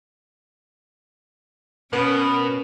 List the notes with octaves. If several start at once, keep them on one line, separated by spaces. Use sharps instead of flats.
B2 B3 C#4 A#4